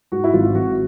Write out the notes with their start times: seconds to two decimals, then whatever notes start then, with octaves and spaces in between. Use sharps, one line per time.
0.12 G#2 F#4
0.24 E4
0.33 G#1 F4
0.55 G#1 F#4